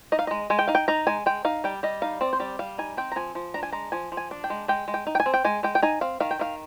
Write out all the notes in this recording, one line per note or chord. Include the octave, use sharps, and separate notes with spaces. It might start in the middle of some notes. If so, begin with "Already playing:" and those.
D#4 D#5
F5
G#3 D#5
G#3 G#5
G5
D#4 F5
G5
D#4 A#5
G#3 G#5
G#3 G5
D#4 F5
G3 G5
G3 D#5
D#4 F5
C4 D5
C5
G3 D5
G3 F5
D#4 G#5
C4 G5
A#5
F3 G#5
F3
D4 A#5
G#5
G#3 A#5
F3 G#5
F3
G#5
D4
G5
G#3
G#3 G5
G#3
G5
D#4
G5
G#5
C4
G5
G#3 G#5
G#3 G5
G5
D#4 G#5
C4 F5
D#3 F5
G5
D#3 F5